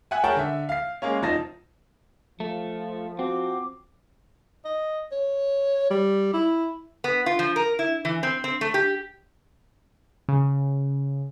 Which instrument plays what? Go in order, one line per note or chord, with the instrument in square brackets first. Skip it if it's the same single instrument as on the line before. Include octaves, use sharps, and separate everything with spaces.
[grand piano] E5 F#5 G#5
G#4 A#4 C#5 F#5 G5 A5
D3 E5
F5 C7
G#3 A#3 C#4
F1 F3 D#4 A5 A#6
[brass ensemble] F3 [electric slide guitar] A3
[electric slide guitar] C4 [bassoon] F#4 [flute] D6
[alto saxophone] D#5
C#5
G3
E4
[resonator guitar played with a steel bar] B3
F4
F3
A#4
E4
E3
C4
C4
A3
G4
[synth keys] C#3